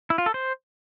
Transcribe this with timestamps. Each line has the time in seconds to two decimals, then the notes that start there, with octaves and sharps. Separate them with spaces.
0.10 E4
0.18 F4
0.26 A4
0.34 C5